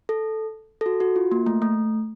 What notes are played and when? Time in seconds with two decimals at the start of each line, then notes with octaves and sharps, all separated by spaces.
0.09 A4
0.81 A4
0.86 F#4
1.00 F#4
1.16 F4
1.31 A#3
1.46 A3
1.62 A3